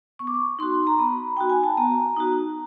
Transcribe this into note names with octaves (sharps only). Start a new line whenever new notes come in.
B3 C#6
D6
C#6
D#4 F#4 C6
A#5
B3 B5
D#4 F#4 G5
G#5
A5
B3 A#5
D#4 F#4